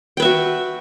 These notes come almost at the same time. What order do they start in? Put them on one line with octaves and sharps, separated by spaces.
G5 B4 E5 F#4